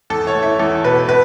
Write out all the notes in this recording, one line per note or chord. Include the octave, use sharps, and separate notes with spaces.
E2 A4
C#5
A3
E4
E2 A4
B2 B4
B4